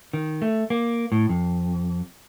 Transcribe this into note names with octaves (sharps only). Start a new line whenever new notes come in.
D#3
A3
A#3
A2
F2